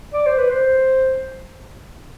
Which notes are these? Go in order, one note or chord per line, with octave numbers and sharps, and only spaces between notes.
D5
C5
B4
C5